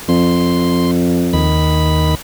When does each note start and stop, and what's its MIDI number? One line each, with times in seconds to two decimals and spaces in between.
0.09 1.57 41
0.09 0.91 84
1.33 2.15 39
1.33 2.15 51
1.33 2.15 83